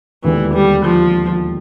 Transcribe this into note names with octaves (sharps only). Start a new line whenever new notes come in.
E1 D#2 D3 E3
G3
F3